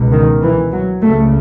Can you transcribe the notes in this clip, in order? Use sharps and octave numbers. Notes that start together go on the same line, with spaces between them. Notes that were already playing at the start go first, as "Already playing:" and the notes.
Already playing: C#2 B2
D#3
E3
F#3
C#2 C#3 A3